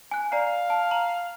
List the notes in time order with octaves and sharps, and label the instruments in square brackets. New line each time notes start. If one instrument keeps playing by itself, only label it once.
[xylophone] G#5 F#6
[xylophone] D5 A#5 C7 [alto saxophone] F5
[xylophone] A5
A#5 F#7